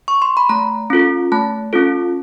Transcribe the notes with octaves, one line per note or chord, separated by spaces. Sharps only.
C#6
C6
B5
A3 A#5
C#4 F4 A4
A3 A5
C#4 F4 A4